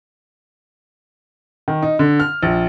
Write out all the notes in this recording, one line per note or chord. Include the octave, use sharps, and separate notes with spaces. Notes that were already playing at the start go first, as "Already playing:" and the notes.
D#3
D#4
D3
F6
A#1